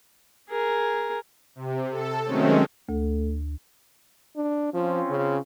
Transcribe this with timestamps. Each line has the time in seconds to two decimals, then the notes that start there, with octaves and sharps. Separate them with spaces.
0.49 G#4 A#4
1.55 C3
1.91 A4
2.25 D#3 F#3 G#3 A3 C4 C#4
2.89 D2 A3
4.36 D4
4.74 F3 C4 C#4 F4
5.09 C#3